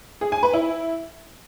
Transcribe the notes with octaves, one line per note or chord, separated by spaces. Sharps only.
G#4
G#5
B4
E4